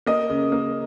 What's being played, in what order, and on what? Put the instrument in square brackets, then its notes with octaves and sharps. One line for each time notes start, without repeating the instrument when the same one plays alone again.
[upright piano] A#3 D#5
C#3
A#3